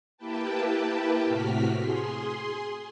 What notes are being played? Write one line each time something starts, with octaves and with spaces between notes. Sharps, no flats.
A#3 E4 G4 B4 G5 A5
A2 C3 F#4 F6 B6
G#4 C6